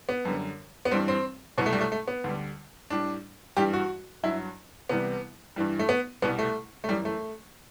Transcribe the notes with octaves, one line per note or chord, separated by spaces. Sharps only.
B3
F#2 D3 G3
B3
G2 E3 G3 C4
C4
C2 B2 F#3 B3
A3
G3
A3
A3
B3
D2 D3 G3
A2 G3 D4
G2 E3 G3 G4
F#4
G2 F#3 E4
C2 C3 E3 G3 B3
G2 E3 G3
A3
B3
C2 B2 G3 B3
A3
A3
F#2 E3 G3
A3